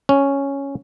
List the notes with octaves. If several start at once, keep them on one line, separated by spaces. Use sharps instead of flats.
C#4